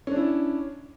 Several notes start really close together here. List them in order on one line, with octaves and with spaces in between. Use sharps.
C#4 D4 E4